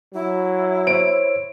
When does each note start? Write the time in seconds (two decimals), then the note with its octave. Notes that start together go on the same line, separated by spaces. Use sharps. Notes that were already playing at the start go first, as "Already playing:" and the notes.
0.13 F#3 E4
0.87 C5 C#5 D7